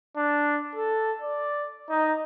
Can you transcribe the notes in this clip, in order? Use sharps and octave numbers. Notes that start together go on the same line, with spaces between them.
D4
A4
D5
D#4